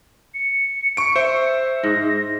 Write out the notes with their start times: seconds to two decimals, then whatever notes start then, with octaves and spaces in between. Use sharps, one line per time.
0.34 C#7
0.97 C#6 D7
1.16 C5 E5
1.83 G#2 A#6